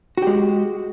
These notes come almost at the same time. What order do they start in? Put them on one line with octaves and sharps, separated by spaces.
F#4 G4 G#3